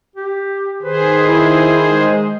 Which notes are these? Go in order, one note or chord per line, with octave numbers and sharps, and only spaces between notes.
G4
D#3 G#4 B4 C5
E4
G#3